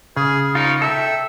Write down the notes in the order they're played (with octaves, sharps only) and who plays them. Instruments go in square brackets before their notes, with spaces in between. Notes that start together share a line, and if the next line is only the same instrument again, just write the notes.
[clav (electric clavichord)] C#3 [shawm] G#4
[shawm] D#4 [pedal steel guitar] F4 A#4 C#5
[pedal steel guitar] A4 G5 [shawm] E5